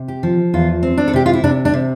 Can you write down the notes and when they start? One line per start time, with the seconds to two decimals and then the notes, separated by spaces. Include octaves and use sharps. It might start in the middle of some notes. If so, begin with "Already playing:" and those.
Already playing: C3
0.08 G4
0.23 F3
0.54 E2 F4
0.83 C4
0.97 D4
1.08 A4
1.13 C3 G4
1.26 F4
1.33 E4
1.44 C3 D4
1.65 D4
1.74 C3